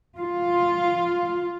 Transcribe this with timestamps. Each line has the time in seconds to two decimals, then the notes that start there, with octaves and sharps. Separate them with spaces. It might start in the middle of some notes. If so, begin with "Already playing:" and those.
0.18 F4